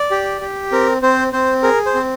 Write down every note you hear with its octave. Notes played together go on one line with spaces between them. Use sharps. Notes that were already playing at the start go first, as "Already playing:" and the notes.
Already playing: D5
G4
G4
C4 A#4
C4 C5
C4 C5
G#4 A#4
C5
C4